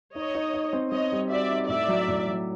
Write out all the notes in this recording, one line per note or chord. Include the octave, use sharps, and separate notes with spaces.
D#4 C#5 D#5
D#4
D#4
C4
C4 C#5 D#5
G3
F#4 D5 E5
D#4
A2 D5 E5
F#3
A2
F#3